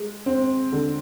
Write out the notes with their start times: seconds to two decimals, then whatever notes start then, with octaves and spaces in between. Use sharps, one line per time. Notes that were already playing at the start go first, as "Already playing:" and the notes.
Already playing: G#3
0.26 C4
0.72 D3